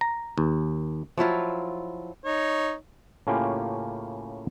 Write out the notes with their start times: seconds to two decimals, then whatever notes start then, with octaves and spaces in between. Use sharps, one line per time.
0.01 A#5
0.38 D#2
1.17 F3 F#3 E4 F4
2.24 D#4 C#5
3.27 A2 C#3 A#3 C#4 F4 G4